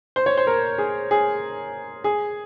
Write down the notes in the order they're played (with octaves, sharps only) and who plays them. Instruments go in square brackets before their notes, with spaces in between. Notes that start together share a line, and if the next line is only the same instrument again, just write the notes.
[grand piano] C5
C#5
C5
A#4
G#4
G#4
G#4